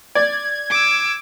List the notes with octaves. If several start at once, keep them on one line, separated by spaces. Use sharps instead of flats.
D5 G#6
D6 E6